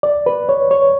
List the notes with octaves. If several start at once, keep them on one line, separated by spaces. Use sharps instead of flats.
D5
B4
C#5
C#5